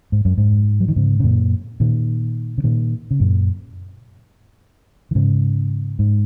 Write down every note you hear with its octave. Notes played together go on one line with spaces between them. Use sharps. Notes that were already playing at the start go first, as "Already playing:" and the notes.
G#2
F#2
G#2
F#3
D#3
G#2 C#3
C#3
F#2 A#2
A#2 D#3
C#3
A#2 D#3
C#3
F#2 A#2
D#3
G#2 C#3
G#2